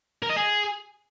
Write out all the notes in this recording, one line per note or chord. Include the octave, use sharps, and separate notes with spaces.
A#4
D#5
G#4